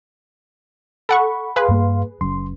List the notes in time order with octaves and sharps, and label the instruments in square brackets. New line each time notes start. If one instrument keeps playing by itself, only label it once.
[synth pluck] A4 F#5 C#6 [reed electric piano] B5
[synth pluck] G#4 B4 [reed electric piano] F5 C6
[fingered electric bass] G2 A#3
[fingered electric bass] F#1 F#2 [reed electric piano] C6